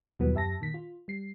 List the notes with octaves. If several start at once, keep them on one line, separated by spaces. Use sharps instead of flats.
D#2 B2 E3 F#3 G3 B3
F#2 G4 E5 A5 A#6
A#2 D#3 B6
F4
G3 C7